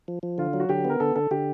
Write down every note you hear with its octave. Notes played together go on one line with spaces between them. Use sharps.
F3
F3
D3 F4
F#3
F#4
D3 G4
B3 A#4
D3 A4
D3 A4
D3 G4